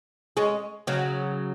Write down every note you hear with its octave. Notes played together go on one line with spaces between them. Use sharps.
G#3 C#4
C#3 F#3